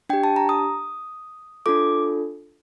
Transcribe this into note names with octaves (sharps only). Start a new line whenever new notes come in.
D4 G4 G5
A5
A#5
D#6
D4 F4 A4 D6